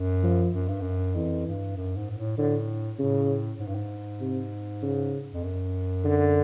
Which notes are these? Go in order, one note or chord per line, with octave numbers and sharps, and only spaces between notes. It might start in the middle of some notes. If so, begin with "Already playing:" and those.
Already playing: F#2
F3
F#2
G2
F#2
F2 E3
G2
F#2
G#2
G#2
A2
A2 D3
A2 C#3
G#2
G2
G#2
C3
C#3
F2
F#2
D3